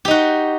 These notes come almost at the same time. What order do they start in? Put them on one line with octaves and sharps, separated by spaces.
G4 D#4 F#4